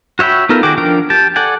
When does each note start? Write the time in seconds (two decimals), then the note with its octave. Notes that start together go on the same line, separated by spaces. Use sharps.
0.19 F#4 C#5 E5 G5 B5
0.49 B3 D#4 F4 A4 A#4
0.63 D#3 F#4 G#4 G5 D6
0.78 F3 D4 A#4 G5
1.10 G4 G5 A5
1.36 A4 D5 F#5 G#5